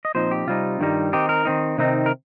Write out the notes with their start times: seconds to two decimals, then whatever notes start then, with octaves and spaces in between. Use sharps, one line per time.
0.05 D#5
0.15 A#2 F3 C4 D#4 C5
0.31 G4
0.47 C3 G3 C4 D#4 F4
0.80 G2 D#3 G3 D#4
1.13 D#3 C4 D#4 G4
1.29 A#4
1.45 D#3 C4 D#4
1.78 C3 D#3 C4 D#4
2.06 A#4